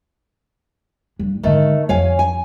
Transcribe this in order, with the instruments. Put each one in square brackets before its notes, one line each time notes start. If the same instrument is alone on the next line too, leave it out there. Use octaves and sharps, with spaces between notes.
[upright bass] G2
[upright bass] G#2 D3 [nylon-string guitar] D#3 A3
[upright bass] F2 [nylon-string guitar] C#5 F5 G#5
[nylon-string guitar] G#5